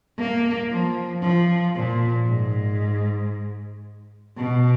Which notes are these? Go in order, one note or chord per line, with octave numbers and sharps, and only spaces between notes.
A#3
F3
F3
A#2
G#2
B2